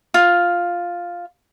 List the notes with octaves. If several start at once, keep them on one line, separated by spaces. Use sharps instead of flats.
F4